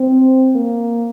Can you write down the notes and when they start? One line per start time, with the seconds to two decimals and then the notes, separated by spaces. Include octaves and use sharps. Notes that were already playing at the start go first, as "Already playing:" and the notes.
Already playing: C4
0.55 A#3